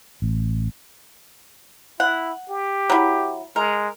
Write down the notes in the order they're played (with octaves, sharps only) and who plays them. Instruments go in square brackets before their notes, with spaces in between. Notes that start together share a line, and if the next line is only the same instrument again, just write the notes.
[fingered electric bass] A1
[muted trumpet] E4 [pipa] F#5
[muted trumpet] G4
[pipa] F#3 E4
[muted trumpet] G#3 [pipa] A#4